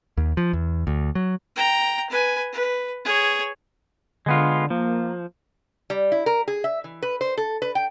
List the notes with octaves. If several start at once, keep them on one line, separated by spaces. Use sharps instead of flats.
D#2
F3
E2
D2
F#3
G5 A#5
B4 G#5
B4
G#4 C#5
D3 G#3 B3 F4
F3 A#3
G3
E4
A#4
G#4
E5
E3
B4
C5
A4
B4
G5